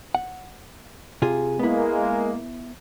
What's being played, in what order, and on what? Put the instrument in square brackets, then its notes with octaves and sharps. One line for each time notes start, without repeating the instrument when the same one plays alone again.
[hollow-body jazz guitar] F#5
C3 F4 G#4
[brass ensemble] G#3 A#3 [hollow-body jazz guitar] B3 E4